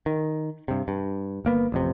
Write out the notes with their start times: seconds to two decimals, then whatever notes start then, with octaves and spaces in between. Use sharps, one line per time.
0.06 D#3
0.68 G2 C3
0.88 G2
1.45 G1 A#3 B3
1.72 A1 F2 C3